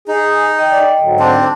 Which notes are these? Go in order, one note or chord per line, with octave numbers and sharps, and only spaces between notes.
D#4 G#4
D#5 G5
D5
G#2 D3 F#3
C4 D4